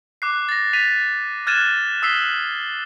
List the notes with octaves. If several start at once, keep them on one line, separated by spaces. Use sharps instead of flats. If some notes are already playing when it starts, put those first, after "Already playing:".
D6 F#6 C7
A6 A#6
A6 B6 D#7 F7
F6 F#6 G#6 A6 D#7 E7
D#6 E6 B6 C7 G7